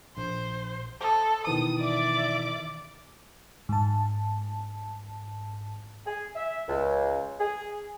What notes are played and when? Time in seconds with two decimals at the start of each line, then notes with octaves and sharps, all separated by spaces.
0.17 A#1 C5
1.01 A4 C5 D#6
1.47 B2 D#3 E3 D#6
1.81 D5 E5 D6
3.69 G#2 A5
6.06 G#4
6.36 E5
6.68 C#2
7.40 G#4